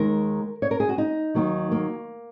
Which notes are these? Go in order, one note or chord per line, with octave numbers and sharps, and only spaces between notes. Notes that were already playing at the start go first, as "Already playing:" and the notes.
Already playing: D#2 D#3 G#3 A#4
C#5
A#4
G#4
F#4
D#4
D#2 D#3 F#3 A#3
A#3